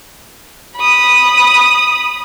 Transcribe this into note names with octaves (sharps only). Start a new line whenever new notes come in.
B5 D#6